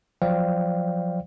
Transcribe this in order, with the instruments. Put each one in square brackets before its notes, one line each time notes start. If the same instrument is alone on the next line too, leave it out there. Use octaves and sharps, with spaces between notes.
[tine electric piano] F3 F#3 C5 D5 F5 G5